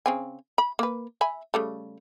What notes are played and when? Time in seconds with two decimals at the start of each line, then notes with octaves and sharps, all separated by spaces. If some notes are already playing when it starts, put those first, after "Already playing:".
0.06 C#3 C4 G#5
0.58 B5
0.79 A#3 B4
1.21 E5 G#5 B5
1.54 C#3 G3 A3